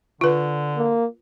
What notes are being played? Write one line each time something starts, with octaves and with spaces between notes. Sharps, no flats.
D3 F4 B4
A#3